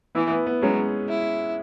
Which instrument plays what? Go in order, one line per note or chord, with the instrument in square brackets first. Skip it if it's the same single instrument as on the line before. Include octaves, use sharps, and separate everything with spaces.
[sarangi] E3 [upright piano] B3 E4
[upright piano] B3
B3
[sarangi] F#3 [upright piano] G#3 C#4
[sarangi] E4